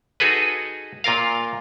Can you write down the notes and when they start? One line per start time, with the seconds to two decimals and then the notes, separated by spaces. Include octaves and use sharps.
0.20 D#4 F#4 G#4 A4 B4
1.04 A#2 F4 A#4 F5